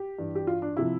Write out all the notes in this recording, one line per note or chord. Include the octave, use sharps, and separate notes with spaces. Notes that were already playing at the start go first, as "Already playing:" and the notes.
Already playing: G4
G2 E3
G4
F4
D4
C3 F3 E4